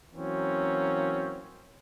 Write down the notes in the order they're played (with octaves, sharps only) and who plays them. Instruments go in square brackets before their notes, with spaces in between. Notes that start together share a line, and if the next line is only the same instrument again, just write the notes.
[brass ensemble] E3 F#3 A#3 C4 C#4